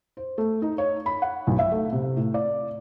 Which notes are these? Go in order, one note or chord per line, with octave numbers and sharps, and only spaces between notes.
C5
A3
D#4
C#5
B5
F#5
B1
E5
A3
C3
A2
D5